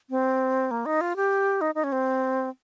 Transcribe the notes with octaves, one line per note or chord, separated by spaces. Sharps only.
C4
A#3
D#4
F4
G4
D#4
D#4
C#4
C4